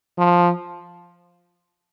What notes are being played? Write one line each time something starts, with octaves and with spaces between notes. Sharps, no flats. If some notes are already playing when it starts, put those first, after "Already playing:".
F3